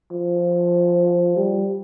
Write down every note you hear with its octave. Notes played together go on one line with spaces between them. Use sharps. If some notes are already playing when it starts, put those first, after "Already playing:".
F3
G3